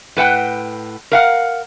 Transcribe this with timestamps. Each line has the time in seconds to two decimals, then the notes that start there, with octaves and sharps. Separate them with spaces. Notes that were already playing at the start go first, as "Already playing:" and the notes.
0.17 A2 B4 F#5 G5
1.12 A#4 F5 F#5